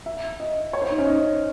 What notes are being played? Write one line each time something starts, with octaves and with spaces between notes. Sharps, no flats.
E5
D#5
C#5
C5
D#4
C#4
D#4